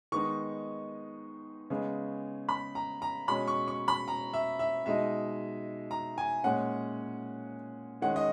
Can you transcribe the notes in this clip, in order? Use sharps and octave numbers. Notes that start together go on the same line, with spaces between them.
D#3 G#3 B3 D#4 C#6
C#3 G#3 B3
B5
A#5
A#5
B2 G#3 C#4 B5
C#6
C#6
B5
A#5
E5
E5
B2 G#3 D#4 E5
A#5
G#5
A#2 G#3 C#4 F#5
D#3 G#3 C#4 F#5
D#5